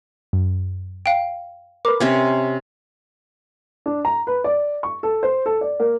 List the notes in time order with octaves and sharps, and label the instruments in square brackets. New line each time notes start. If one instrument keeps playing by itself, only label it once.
[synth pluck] F#2
[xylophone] F5 G5
[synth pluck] A#4 B4 [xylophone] D6
[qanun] C3 C4 C#4
[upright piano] D4
A#5
B4
D5
C#6
A4
C5
A4
D5
A#3